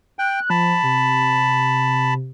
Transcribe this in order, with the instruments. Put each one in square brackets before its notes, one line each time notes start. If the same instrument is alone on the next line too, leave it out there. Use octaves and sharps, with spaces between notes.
[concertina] G5 [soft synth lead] F#6
[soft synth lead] F3 [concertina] A5 B5
[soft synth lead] C3